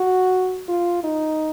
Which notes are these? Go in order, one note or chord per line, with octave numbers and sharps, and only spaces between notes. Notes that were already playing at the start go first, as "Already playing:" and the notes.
Already playing: F#4
F4
D#4